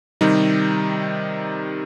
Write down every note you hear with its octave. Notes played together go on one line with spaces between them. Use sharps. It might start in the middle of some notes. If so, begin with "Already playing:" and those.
C3 D#3 G3 D#4